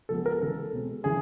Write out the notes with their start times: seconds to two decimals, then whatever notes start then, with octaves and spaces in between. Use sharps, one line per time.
0.09 C#3 F3 G#3 B3 A4
0.26 A#4
0.41 C#3 E3 G#3 A4
0.73 B2 G#3 C4
1.03 C#3 E3 G#4